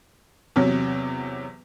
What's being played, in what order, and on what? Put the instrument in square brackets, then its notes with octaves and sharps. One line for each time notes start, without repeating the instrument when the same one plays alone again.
[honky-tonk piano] E2 C3 F#3